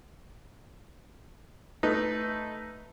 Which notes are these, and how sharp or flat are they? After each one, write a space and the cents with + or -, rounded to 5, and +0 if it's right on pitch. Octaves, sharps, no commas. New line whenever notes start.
A3 +0 D#4 +0 B4 +0